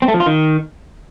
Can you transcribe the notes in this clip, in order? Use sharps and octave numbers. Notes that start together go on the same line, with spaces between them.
C4
A3
F3
F4
D#3